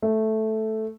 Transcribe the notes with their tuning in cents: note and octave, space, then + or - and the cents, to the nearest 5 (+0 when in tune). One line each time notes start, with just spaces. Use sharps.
A3 -5